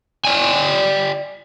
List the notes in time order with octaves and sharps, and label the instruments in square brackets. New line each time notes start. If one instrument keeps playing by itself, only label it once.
[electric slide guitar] D5 G5 G#5